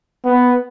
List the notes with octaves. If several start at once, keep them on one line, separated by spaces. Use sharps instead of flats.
B3